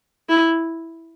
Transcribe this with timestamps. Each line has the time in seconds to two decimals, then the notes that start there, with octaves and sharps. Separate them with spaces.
0.29 E4